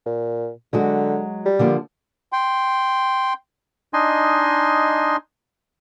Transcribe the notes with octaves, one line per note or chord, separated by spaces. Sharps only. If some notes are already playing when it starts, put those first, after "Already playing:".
A#2
D3 F#3 G#3 F#4
G3
D3 F3 A#3
G5 C6
D4 D#4 D#5 G#5 C6